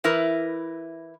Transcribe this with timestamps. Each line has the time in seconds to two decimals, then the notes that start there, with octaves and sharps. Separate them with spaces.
0.04 E3 E4 A#4 B4